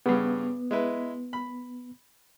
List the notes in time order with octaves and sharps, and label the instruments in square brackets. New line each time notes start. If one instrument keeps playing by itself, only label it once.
[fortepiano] G2 C#3 [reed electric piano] B3
[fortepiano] G#3 E4 B4
B5